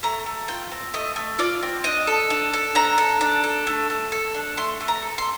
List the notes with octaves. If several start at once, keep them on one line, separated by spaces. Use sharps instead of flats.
A3 A#5
A3
F4 G5
C4
A3 D#5
A3
F4 D5
C4
D4 D#5
A4
D4
A4
D4 A#5
A4
D4
A4
A3
A3
A4
D4
A3 C6
A3
A#5
A4
C6